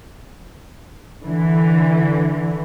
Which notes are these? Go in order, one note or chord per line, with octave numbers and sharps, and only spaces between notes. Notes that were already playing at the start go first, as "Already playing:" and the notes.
D3 E3